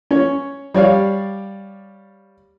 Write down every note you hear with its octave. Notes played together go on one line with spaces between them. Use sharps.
C#4 C#5
G3 C#5 D5 F5